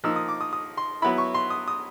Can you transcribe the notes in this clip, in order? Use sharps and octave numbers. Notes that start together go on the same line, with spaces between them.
F3 A#3 D#4 E6
D#6
D6
D#6
D#6
C6
F#3 B3 E4 B5
C#6
C6
D#6
D#6